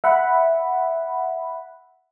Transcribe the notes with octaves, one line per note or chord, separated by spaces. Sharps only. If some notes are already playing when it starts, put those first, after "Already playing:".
E5 F#5 B5